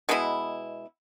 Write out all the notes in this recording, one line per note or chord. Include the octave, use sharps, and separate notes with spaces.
B2 G#3 B3 E4